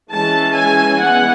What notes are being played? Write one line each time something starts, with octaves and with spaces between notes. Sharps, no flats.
E3 G#3 C#4 A5
G#5
E3 G#3 B3 F#5